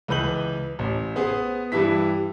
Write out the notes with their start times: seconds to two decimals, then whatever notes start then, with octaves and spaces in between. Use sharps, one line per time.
0.08 C#2 E3 B4 G6 F#7
0.79 A1
1.16 B3 G#4 C5
1.72 G2 E3 G3 E4 B6